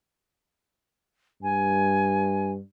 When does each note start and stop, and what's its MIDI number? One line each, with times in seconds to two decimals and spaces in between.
1.43 2.60 43
1.43 2.51 80